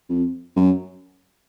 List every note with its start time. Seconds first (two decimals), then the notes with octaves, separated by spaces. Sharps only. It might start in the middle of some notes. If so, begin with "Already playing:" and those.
0.09 F2
0.56 F#2